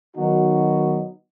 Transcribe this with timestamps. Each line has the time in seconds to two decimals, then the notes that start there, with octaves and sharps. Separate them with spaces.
0.14 D#3 F#3 B3 D#4 F#4